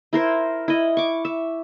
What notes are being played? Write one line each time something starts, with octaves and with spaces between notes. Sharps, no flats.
E4 A#4 C5
E4 D#5
C#6 D6
E5